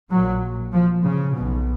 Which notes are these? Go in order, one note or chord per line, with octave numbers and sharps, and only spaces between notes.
A#1 A#2 F#3
F3
C#3
B1 B2